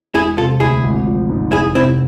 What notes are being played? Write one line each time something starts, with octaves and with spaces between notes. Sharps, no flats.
E1 E4 G#4
C3 F4 A4
D2 E4 G#4
G#1
F3
G#2
F1 E4 G#4
C3 C4 E4